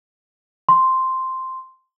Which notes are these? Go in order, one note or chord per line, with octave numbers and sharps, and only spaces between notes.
C6